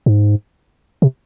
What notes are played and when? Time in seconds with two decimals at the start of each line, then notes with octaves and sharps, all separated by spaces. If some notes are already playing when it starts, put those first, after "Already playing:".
0.06 G#2
1.02 C3